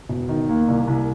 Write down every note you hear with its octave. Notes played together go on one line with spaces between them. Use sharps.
E1
D#3
D#2
C2
C2